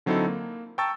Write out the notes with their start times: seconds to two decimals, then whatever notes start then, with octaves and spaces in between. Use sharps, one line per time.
0.06 D3 F#3 C4 D#4 E4 A4
0.28 A#3
0.78 G5 A5 A#5 C#6 E6 A6